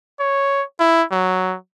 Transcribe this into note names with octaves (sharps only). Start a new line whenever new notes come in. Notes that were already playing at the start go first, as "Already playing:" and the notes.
C#5
E4
F#3